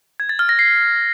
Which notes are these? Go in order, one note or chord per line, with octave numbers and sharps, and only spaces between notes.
G#6
A6
F6
A#6
C7